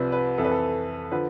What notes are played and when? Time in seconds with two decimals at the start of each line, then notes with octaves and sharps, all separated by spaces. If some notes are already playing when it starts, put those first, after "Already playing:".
Already playing: C2 C3 F3 B4 D5
0.12 B4
0.38 F2 E3 A4
0.44 B4
0.51 A4
1.12 D3 F3 B4